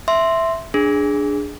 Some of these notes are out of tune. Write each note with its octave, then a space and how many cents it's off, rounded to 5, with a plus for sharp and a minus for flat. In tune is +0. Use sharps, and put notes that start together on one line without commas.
E5 +0 C6 +0
D4 +0 G#4 +0